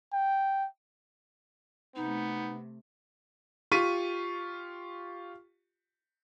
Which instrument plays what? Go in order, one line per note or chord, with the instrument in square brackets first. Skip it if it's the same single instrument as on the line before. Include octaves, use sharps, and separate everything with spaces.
[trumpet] G5
[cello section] C3 A3 [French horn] B3 [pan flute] D#4
[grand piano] F4 G4 C#6 B6 D#7